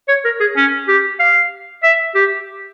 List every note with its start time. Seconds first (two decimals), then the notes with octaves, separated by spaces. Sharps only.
0.08 C#5
0.24 A#4
0.40 G#4
0.56 C#4
0.88 G4
1.19 F5
1.83 E5
2.15 G4